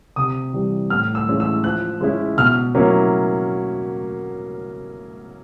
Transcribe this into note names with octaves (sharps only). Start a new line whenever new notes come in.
C3 D#6
E3 G3
A2 F6
E6
E3 G#3 C#4 E4
E6
F3 F#6
G#3 C#4 E4
B2 F6
F#3 A#3 C#4 E4